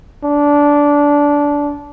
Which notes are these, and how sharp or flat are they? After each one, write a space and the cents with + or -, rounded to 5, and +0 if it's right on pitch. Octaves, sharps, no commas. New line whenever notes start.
D4 -15